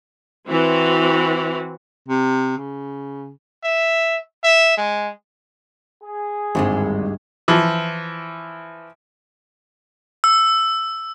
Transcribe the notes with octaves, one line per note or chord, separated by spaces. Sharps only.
E3 C4 F#4
C3
C#3
E5
E5
G#3
G#4
G#1 D2 G2 G#3
E3 F3
E6